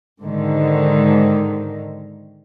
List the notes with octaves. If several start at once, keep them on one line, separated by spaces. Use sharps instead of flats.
G#2 D3 D#3